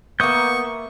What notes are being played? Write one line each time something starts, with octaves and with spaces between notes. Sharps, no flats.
A#3 B3 E5 C#6 D#6 G6